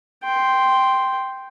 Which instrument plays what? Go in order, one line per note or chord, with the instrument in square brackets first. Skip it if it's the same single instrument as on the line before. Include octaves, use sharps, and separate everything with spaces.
[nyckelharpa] G5 C6